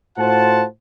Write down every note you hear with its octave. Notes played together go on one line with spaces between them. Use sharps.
A2 F4 F#4 C5 F#5 A5